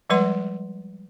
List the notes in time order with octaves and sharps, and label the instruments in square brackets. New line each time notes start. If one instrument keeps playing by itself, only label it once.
[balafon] F3 G3 G#3 B4 F#5 C6